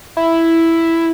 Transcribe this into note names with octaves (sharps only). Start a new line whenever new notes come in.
E4